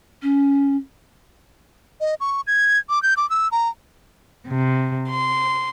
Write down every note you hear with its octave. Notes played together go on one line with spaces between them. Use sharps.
C#4
D#5
C#6
G#6
D6
G6
D6
E6
A#5
C3
C6